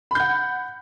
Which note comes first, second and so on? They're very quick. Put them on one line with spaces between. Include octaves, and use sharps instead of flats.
B5 G6 F#5